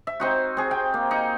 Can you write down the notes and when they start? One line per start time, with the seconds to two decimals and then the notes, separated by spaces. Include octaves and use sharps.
0.07 E5
0.20 C4 D#4 F#4
0.57 C4 G#4
0.71 G5
0.94 A#3
1.11 D#4